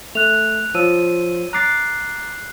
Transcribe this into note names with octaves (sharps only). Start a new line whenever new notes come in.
A3 F#6 F7
F3 C#5 E6 D#7
A#5 D6 F#6 A6 C7